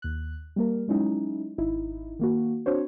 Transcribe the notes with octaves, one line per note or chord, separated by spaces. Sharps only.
D#2 F#6
G3 A#3 A#4
F#3 G#3 C#4 D#4 E4
G#1 D#4 E4
D#3 A#3 F#4
C4 D4 F#4 C5 C#5